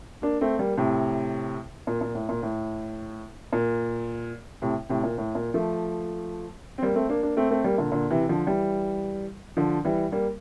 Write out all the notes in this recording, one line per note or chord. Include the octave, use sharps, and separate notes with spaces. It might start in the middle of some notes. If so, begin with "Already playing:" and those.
A#3 D4
A3 C4
G3 A#3
A2 C3
A#2
A#2
A2
A#2
A2
A#2
A2 C3
A2 C3
A#2
A2
A#2
F3 A3
C4
G3 A#3
A3 C4
A#3 D4
A#3 D4
A3 C4
A3 C4
G3 A#3
A#2 D3
A#2 D3
C3 E3
D3 F3
E3 G3
D3 F3
E3 G3
G3 A#3